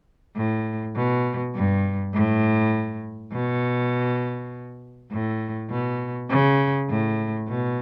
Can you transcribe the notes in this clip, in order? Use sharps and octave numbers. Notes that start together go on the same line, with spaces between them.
A2
B2
G2
A2
B2
A2
B2
C#3
A2
B2